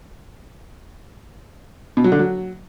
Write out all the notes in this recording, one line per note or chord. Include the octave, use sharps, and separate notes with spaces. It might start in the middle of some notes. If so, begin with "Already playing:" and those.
B2
F#3
D3
F#3